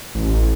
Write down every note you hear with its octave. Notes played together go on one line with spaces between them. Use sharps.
A1